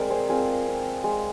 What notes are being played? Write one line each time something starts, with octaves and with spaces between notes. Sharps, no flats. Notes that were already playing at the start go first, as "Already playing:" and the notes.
Already playing: G#3 C4 A#4 D5
G#4 C5
C4 F4 G#4
C4
G#3